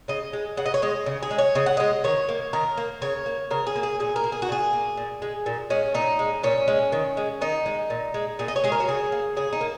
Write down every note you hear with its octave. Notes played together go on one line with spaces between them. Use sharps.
C#3 D#5
G#3
C#3 F#5
D#5
C#5
G#3 D#5
C#3
G#4
G#3
C#5
C#3 D#5
F#5
G#3 D#5
D#3 C#5
A#3
D#3 A#4
A#3
C#3 C#5
A#3
C#3 A#4
G#4
A#3
G#4
A#2 G#4
A#4
A#3
G#4
F#4
A#2 G#4
A#3
A#2
G#3
A#2
G#3 C#4
A#2 D#4
G#3
A#2 C#4
G#3
D#3
G#3
D#3 D#4
G#3
A#2
G#3
A#2 G#4
D#5
C#5
G#3 G#4
A#4
F#4
C#3 G#4
A#3
C#3 G#4
D#4
A#3